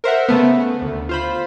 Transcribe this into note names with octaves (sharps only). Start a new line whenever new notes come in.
A#4 C5 E5 F#5
C#3 A3 B3
D2
F4 C5 B5